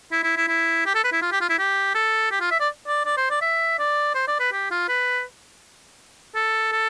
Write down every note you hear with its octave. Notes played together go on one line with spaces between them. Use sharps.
E4
E4
E4
E4
G4
A4
B4
E4
F4
G4
F4
E4
G4
A4
G4
F4
E5
D5
D5
D5
C5
D5
E5
D5
C5
D5
B4
G4
F4
B4
A4
A4